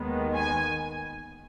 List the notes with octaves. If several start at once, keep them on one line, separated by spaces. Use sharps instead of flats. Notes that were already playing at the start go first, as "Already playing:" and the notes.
Already playing: D#2 D#3 G#3 B3
G#5